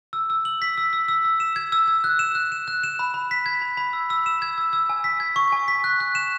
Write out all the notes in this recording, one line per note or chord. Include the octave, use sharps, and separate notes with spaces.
E6
E6
F#7
B6
E6
E6
E6
E6
E7
G#6
E6
E6
F#6
E7
F#6
E7
F#6
E7
B5
B5
B6
G#6
B5
B5
E6
E6
E7
G#6
E6
E6
G#5
B6
G#6
C#6
G#5
B6
F#6
F#6
E7